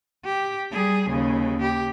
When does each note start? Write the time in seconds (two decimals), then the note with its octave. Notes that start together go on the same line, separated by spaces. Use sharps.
0.25 G4
0.71 G3 G#4
1.09 D#2 C#3
1.62 G4